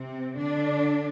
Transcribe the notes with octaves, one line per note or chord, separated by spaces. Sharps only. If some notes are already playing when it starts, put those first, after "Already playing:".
Already playing: C3 C4
D3 D4